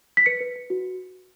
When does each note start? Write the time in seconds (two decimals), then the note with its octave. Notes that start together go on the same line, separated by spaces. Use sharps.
0.17 B6
0.26 B4 C#7
0.41 B4
0.56 B4
0.70 F#4